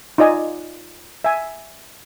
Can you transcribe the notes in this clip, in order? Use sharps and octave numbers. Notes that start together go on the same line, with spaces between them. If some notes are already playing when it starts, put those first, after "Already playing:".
D#4 F4 D5 D#5 G#5
E5 G#5